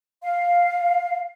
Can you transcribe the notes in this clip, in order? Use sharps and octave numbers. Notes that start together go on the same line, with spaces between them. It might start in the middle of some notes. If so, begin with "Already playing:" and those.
F5